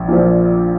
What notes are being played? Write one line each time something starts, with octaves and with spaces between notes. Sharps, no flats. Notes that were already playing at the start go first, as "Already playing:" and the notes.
Already playing: A#1
A#2 F3